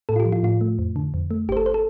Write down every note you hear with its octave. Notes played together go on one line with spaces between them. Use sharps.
A2 A4
F4
G4
F3
F4
A2 F4
A3
F2
D3
F2
A3
G1 G4 C5
A4
C5
A4